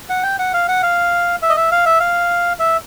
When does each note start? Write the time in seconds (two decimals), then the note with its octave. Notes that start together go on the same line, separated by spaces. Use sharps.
0.10 F#5
0.23 G5
0.39 F#5
0.53 F5
0.69 F#5
0.83 F5
1.42 E5
1.49 D#5
1.57 E5
1.72 F5
1.86 E5
2.00 F5
2.59 E5